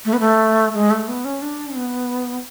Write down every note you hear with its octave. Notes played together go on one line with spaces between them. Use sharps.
A3
B3
A3
G#3
A3
B3
C#4
D4
B3